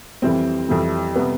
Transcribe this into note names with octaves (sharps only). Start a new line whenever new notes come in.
F2 E3 G3 C4
F2 E3 G3
C3 G3 B3